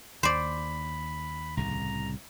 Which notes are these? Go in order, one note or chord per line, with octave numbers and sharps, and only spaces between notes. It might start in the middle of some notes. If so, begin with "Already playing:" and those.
D#2 C5 D5 B5
C2 A2 C#3 A#5